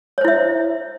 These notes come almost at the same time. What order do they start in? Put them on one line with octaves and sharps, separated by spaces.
C#5 C5 E4 E5